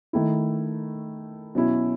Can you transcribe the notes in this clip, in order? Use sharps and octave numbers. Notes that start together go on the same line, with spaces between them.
D#3 A3 E4
B2 F#3 C#4 E4